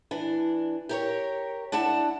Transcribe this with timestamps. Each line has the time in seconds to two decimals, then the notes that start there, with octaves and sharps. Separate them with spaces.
0.11 E3 D4
0.89 G4 A#4 C#5
1.72 D4 E4 F#5 A5